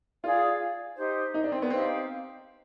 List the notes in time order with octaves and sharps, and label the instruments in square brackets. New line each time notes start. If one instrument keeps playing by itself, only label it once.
[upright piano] F4 [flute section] G#4 D5 F5
[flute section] D#4 G4 C5
[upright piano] D#4
D4
C4
B3
[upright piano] C4 [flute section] D#4 G4 C5 F5